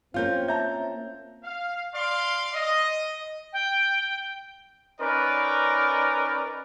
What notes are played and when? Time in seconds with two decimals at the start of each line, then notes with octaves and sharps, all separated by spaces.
0.14 A#3 C4 C#4 F4 F5 G6
0.48 E5 A5 A#5 G6
1.44 F5
1.94 D5 F5 C6
2.54 D#5
3.53 G5
5.00 C#4 D#4 A#4 B4 D5